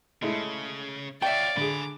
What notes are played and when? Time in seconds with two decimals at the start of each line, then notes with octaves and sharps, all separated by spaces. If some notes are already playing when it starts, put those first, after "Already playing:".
0.22 C#3 G#3 A3 E4
1.22 F4 C#5 D5 E5 F5 G5
1.57 D3 G#4 G#5 B5 D6